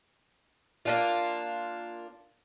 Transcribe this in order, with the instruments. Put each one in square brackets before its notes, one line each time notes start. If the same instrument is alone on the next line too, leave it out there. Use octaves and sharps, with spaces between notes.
[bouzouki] A#3 D4 F4